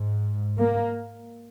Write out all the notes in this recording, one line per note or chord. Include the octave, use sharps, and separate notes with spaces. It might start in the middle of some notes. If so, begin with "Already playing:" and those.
Already playing: G#2
A#3